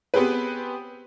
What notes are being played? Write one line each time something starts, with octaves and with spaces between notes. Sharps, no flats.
B3 C4 G4 G#4 B4